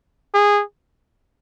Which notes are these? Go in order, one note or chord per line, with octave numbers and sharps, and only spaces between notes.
G#4